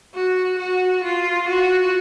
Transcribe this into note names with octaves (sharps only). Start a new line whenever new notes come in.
F#4
F#4
F4
F#4